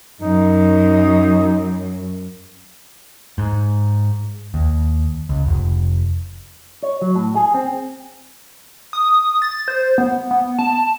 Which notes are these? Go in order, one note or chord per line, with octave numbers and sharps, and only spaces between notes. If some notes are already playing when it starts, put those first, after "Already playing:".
F#2 D#4
G#2
D#2
C#2
F1
C#5
F#3
A2
G#4
C4
D#6
A6
C5
B3
B3
A5